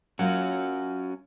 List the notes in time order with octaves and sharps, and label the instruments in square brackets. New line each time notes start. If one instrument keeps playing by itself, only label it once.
[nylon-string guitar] F#3 A#3 F4 [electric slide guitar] C#4 F#4